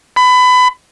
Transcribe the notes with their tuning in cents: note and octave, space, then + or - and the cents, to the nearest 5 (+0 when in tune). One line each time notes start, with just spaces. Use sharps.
B5 +25